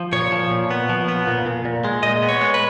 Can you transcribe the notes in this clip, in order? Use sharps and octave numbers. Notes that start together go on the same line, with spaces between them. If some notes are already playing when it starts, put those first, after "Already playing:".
Already playing: F3
A#2 C#5
F3
A#2
B3
F3
B3
A#2
A#2
A#2
G#3
A#2 D#5
B3
C#5
G#3
B4